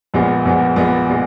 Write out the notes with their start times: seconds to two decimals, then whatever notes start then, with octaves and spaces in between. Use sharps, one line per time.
0.14 A#1 A#2 G#3 B3
0.45 A#1 A#2 G#3 B3
0.76 A#1 A#2 G#3 B3
1.10 A#2 G#3